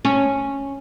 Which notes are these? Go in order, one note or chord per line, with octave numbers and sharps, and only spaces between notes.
C#4